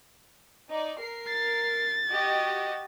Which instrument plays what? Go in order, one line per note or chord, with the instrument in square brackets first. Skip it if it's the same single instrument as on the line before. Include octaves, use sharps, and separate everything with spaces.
[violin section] D#4 D5
A#4 C7
[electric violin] A6
[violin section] F#4 G4 D#5